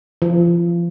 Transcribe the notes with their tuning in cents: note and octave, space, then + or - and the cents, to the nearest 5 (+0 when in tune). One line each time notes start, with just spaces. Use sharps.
F3 -30